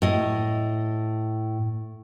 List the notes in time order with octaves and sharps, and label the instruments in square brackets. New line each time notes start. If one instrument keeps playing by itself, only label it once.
[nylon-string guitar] A2 D#5